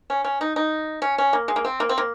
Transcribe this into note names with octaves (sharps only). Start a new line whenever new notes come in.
C#4
C#4
D#4
D#4
C#4
C#4
A#3
G#3
A#3
C4
A#3
C4
A#3